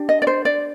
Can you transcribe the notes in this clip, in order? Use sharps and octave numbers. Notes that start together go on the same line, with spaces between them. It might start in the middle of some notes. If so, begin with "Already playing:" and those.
Already playing: D4 G4
D#5
D5
C5
D5